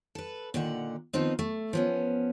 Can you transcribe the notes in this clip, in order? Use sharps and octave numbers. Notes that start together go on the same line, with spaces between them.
A4 B4
A#2 D3 D#3 F#5
D#3 F3 B3 C4 D#4
A3
F3 B3 C#4